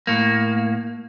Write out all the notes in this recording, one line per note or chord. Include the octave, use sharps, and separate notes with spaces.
A2 A#3